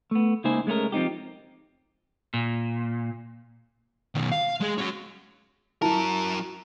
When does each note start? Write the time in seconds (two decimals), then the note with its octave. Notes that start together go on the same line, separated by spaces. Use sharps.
0.11 A3 B3
0.44 C#2 A#3 D#4 E4 C5 G#5
0.67 G#3 A3 C#4 E4 A#4
0.92 F3 C4 D#4 G4
2.34 A#2
4.15 B2 D#3
4.32 F5
4.60 G#3 G#4
4.78 C#4 F#4
5.82 F#3 E4 A#4 A5